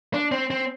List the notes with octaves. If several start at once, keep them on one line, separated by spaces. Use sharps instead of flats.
D4
C4
C4